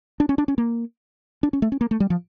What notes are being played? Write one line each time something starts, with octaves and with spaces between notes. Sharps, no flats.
D4
C#4
D4
C#4
A#3
D4
C#4
A3
C#4
A#3
A3
G3
F3